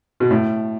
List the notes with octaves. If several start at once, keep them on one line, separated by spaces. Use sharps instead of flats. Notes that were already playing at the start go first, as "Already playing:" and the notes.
B2
A2